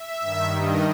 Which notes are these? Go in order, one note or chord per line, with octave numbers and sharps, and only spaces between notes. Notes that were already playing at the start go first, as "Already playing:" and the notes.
Already playing: E5
G2 D#3
D#5